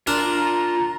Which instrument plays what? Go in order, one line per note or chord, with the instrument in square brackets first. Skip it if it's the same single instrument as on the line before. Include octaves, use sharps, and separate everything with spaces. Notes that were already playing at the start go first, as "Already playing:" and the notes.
[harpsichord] D4 A#4 [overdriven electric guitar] F4 C6 [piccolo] A#5